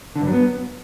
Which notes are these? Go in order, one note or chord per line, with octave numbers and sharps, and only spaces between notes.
D3
G2
F#3
B3